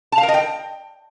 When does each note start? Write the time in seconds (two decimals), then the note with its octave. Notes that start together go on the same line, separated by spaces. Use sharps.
0.12 A5
0.18 F5
0.23 A#4
0.28 D#5
0.34 G5